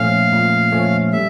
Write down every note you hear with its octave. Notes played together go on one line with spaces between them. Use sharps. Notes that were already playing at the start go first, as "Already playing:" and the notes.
Already playing: A#2 F3 A3 C#4 F5
A#2
F3 A3 C#4
G3 E5